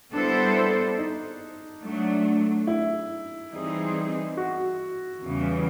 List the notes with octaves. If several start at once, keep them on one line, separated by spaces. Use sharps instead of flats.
G3 B3 D4 E4 A4 C5
D#4
F#3 A3 D4
E4
E3 G3 C4 D#4 G#4
F#4
E2 C#3 E3 G3